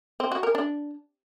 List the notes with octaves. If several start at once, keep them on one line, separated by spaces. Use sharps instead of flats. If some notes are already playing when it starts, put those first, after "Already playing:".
C4
F#4
A#4
D4